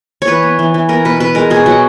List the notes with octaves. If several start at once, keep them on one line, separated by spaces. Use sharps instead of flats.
C#5
E3 B4
B3
E3
E3
B3 A#4
B2 B4
B2 B4
G#3 A#4
B2 G#4
F#3 F#4